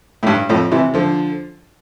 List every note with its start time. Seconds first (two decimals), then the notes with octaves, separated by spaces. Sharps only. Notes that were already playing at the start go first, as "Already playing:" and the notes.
0.23 A2
0.27 G2
0.49 F2 A2
0.71 C3 E3
0.94 D3 F3